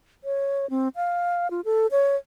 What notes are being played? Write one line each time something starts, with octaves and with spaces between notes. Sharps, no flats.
C#5
C4
F5
F4
A4
C#5